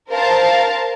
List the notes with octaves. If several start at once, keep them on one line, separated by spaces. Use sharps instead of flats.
A#4 C5 F5 A5